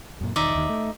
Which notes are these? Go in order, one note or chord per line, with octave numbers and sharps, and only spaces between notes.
F#2 A#2
E1 D#3 D#4 D5 E5
D#2 D#3
A3